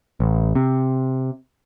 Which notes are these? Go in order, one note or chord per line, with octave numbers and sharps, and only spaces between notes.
A1
C3